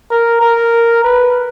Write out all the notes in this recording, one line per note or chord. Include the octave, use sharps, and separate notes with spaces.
A#4
A#4
B4